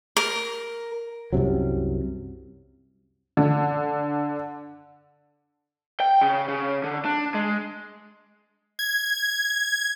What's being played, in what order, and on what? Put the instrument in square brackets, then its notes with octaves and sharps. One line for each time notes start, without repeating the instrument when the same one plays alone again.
[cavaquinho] A#4
[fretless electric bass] C2 F#2 C3 F#3
[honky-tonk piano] D3
[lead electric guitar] G5
C#3
C#3
D3
D4
G#3
[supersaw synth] G#6